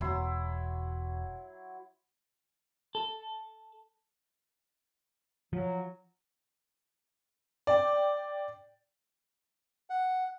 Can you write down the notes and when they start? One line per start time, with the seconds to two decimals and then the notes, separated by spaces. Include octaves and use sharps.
0.01 E1 F#3 E4 C6
2.95 A4
5.53 F3 F#3
7.67 D5 G5
9.90 F#5